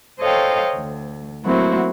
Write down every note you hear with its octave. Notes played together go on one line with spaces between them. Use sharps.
A4 C5 C#5 D#5 F5 G5
D2
F#3 A3 A#3 C4 E4 F#4